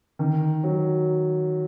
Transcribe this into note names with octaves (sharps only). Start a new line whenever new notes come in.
D#3
F#3